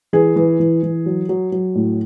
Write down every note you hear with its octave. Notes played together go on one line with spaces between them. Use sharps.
E3 G#4
E3
E3
E3
F#3
F#3
F#3
A2